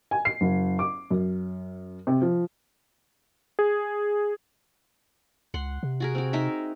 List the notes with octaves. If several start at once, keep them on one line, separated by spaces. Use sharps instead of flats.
G#5
C7
F#1
D6
F#2
C3
F3
G#4
C#2 F#5 C6
C3
F#4 G#4 A#4
C4 F#4
D#4 A#4 E5